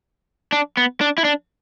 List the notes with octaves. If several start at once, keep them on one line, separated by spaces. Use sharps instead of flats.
D4
B3
D4
E4
D4